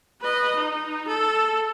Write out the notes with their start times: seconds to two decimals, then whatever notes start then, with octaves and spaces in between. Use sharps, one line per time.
0.21 B4 D#5
0.55 D#4
1.07 A4